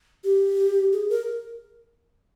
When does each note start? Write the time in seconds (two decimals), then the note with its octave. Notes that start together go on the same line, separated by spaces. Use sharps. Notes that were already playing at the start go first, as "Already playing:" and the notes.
0.24 G4
0.92 G#4
1.09 A#4